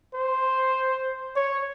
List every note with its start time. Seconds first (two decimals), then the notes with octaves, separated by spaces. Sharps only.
0.14 C5
1.36 C#5